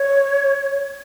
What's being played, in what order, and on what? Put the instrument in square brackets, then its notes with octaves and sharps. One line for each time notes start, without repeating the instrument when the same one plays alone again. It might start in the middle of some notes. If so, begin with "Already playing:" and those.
Already playing: [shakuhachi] C#5